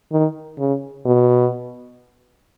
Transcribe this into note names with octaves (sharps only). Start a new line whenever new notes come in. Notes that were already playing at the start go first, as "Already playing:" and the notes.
D#3
C#3
B2